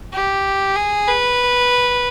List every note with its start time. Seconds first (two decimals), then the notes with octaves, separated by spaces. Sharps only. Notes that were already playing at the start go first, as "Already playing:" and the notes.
0.13 G4
0.76 G#4
1.08 B4